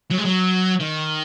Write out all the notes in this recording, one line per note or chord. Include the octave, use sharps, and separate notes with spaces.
F#3
G#3
F#3
D#3